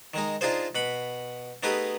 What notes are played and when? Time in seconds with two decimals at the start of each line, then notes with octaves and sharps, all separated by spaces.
0.14 D#3 G#3 D#4
0.41 D4 D#4 F4 G#4 C5
0.75 B2 F#5 B5
1.63 A3 B3 D#4 G4 G#4 B4